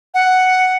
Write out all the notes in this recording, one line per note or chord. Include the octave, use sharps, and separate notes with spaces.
F#5